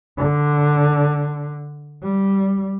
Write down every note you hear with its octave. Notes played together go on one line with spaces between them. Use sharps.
D3
G3